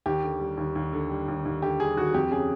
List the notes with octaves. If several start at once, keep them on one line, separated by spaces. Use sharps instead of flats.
D#2 G4
D3
G3
D#2
D#2
D3
G3
D#2
D#2
D3 G4
G3 G#4
D#2 F#4
F2 G4
C#3 G#4